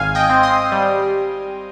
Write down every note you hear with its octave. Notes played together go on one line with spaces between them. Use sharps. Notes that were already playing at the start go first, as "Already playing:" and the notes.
Already playing: G#1 F5 G#5
D#5 G5
C4
C6 D#6
G3